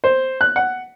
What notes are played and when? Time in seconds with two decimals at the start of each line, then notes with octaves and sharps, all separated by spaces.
0.04 C5
0.41 F#6
0.56 F#5